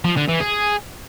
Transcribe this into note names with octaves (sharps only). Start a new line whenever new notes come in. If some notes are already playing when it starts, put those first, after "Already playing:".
F3
D3
E3
G#4